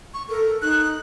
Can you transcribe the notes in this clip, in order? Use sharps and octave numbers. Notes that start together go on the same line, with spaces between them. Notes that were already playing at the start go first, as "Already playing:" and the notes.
C#6
A4 A#4
D#4 F#6